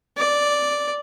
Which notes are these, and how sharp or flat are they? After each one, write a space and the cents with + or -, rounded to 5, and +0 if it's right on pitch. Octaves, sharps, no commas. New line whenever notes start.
D5 -5